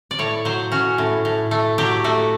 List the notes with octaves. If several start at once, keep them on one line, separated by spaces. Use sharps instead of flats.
D5
A2 C#5
F#3 C5
C#4 F#4
A2
A2
A3
F#3 G4
A3 F#4